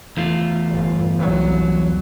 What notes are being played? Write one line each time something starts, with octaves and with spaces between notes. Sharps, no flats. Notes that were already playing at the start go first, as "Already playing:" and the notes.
E2 A3 F4
G1
C2 F#3